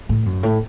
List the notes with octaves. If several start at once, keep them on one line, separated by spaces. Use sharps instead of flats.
A2
F#2
A2